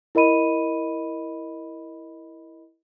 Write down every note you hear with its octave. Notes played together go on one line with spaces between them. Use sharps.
E4 A#4 D#5 B5 D#7